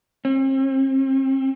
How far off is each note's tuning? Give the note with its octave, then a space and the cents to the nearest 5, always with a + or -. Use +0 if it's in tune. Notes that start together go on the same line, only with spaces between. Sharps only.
C4 +40